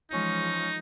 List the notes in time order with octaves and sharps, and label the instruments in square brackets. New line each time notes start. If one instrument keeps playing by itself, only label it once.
[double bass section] E3 F3 G#3 [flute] C#4 [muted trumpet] D#4